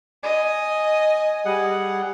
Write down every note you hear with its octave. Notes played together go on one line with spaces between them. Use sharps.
D#5 G#5
G3 G#4 F#5